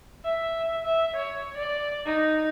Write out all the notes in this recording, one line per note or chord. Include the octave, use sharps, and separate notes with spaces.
E5
E5
C#5
D5
D#4